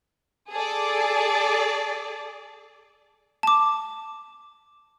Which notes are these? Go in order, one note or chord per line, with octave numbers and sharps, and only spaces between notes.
G#4 A4 D5
A5 D6